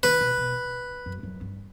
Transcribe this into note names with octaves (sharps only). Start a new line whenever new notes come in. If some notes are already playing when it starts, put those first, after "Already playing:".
D#3 B4
B2
B2
F#2
F#2
G2